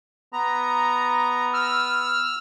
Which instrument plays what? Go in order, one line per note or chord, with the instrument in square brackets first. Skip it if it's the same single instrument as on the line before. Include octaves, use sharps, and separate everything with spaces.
[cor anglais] B3 [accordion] A#5
[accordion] E6 F6